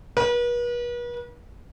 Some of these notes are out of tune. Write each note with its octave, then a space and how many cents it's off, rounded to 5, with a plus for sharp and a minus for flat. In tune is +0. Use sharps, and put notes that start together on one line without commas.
B4 -40